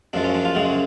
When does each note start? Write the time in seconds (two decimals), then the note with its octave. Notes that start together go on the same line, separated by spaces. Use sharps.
0.13 F#2 F3 G#3 D4
0.24 C#4
0.34 D4
0.45 F4
0.55 F#2 C#3 G#3 F#4